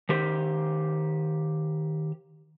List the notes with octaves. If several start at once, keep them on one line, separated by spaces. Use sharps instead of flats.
D#3 G4 C5